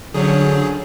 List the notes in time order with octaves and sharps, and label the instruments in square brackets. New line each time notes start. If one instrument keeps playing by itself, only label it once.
[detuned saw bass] D3 [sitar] F3 A3 C#4 [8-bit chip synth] F#3 G#4